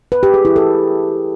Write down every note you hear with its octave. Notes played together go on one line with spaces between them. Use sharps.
B4
G4
G#4
E4
A4